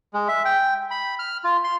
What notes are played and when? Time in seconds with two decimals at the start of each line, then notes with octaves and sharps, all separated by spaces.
0.13 G#3
0.28 E5
0.45 G5
0.91 B5
1.19 F6
1.44 F4
1.64 C6